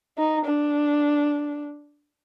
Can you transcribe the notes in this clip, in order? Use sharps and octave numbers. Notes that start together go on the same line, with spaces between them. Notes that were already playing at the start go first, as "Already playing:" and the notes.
D#4
D4